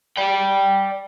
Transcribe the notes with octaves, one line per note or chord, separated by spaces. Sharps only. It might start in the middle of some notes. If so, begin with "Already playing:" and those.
D5 G5